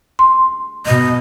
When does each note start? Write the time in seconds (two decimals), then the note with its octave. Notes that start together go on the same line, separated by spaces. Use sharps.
0.19 C6
0.86 B2 D#5